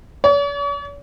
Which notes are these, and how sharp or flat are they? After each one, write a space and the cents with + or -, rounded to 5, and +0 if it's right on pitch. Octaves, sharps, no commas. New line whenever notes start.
C#5 +45